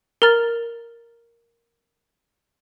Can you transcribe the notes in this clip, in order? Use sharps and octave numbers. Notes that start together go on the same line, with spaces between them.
A#4 A#5 F6 A6